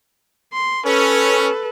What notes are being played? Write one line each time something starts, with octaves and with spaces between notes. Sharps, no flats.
C6
C#4 A4 B4